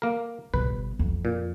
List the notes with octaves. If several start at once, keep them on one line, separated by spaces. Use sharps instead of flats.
A#3 A#4
G1 B2 B4
F2
A#2